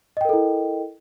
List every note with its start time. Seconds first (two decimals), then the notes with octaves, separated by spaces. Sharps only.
0.17 D#5
0.21 G5
0.25 A#4
0.29 A4
0.33 E4